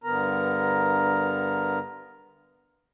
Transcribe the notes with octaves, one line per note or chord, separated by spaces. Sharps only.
G2 D3 B3 A#4 A#5